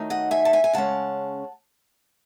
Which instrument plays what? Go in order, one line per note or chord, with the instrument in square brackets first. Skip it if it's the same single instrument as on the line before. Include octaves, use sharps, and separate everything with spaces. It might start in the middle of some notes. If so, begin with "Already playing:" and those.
Already playing: [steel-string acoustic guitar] D#3 F#3 A3 D#4
D#5 F#5
E5 G#5
A5
E5 G#5
G#5
C#3 G#3 C#4 F#5 A5